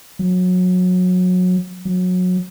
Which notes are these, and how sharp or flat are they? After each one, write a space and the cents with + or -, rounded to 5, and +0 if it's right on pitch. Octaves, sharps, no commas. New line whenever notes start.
F#3 -25
F#3 -25